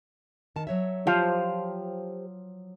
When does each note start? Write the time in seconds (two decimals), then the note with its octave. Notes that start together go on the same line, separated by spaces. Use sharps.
0.56 D#3 A5
0.67 F#3 C#5 E5
1.07 F3 G4 C5 F5